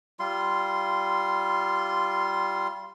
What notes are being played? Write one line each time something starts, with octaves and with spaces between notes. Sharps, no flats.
G3 F4 C6